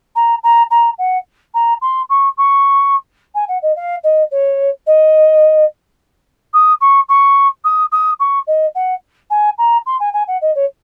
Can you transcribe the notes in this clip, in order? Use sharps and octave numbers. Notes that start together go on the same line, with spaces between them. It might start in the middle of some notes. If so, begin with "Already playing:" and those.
A#5
A#5
A#5
F#5
A#5
C6
C#6
C#6
G#5
F#5
D#5
F5
D#5
C#5
D#5
D#6
C#6
C#6
D#6
D#6
C#6
D#5
F#5
G#5
A#5
C6
G#5
G#5
F#5
D#5
C#5